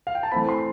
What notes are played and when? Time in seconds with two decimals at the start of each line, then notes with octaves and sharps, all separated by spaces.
0.07 F5
0.15 G5
0.23 A5
0.32 E3 A3 C4 B5
0.49 C6